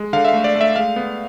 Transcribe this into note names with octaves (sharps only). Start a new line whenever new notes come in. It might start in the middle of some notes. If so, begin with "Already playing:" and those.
Already playing: G#3
D3 F5
E5
F5
A3
D5
A3
E5
G#3 F5
B3